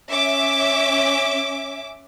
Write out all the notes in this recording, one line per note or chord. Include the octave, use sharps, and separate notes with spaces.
C#4 E5 D6